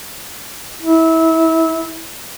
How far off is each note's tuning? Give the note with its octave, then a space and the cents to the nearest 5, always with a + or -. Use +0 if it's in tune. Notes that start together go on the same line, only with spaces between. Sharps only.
E4 -25